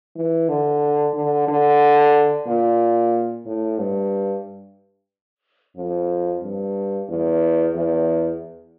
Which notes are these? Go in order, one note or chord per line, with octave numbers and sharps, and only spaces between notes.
E3
D3
D3
D3
A#2
A2
G2
F2
G2
E2
E2